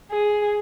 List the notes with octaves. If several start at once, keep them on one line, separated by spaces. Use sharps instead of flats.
G#4